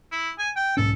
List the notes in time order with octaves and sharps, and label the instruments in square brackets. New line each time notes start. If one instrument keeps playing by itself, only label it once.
[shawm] E4
G#5
G5
[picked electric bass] B1 G#2 C#4 [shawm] A4